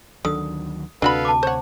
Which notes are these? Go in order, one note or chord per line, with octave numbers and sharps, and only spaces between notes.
D2 D3 D#3 F#3 D#6
D2 C3 D4 F#4 A4 B4 F5 B5
A5 D6
C5 C#5 F#5